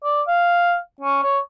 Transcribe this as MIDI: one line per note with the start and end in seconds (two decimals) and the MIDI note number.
0.04 0.22 74
0.28 0.76 77
1.01 1.22 61
1.23 1.39 73